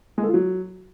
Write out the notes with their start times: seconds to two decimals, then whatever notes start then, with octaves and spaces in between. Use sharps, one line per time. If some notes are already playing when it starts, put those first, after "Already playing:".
0.18 G#3
0.23 A4
0.28 F4
0.34 F#3